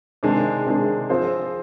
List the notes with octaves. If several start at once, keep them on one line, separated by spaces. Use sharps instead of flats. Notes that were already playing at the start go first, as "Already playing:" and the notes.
C3 D#3 G#3 D4 G#4
C3 D#3 G#3 D4 G#4
F3 C4 F4 G#4 C5